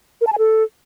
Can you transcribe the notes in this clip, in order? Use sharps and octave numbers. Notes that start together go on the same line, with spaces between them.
A#4
A5
G#5
A4